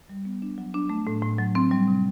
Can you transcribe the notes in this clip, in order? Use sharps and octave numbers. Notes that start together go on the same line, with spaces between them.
G3
B3
D4
F#3
D4
A3
A2
A2
F#3
C4
G3
C3